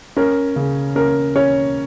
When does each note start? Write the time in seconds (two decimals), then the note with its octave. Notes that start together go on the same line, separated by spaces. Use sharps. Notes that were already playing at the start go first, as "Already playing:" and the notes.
0.17 C#4 A#4
0.56 C#3
0.96 C#4 A#4
1.36 C#4 C#5